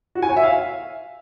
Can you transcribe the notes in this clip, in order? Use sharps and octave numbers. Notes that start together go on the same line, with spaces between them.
F#4
G#5
C#5
E5
F5